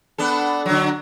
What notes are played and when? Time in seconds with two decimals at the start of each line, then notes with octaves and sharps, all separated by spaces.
0.18 B3 D4 A4
0.66 D3 F#3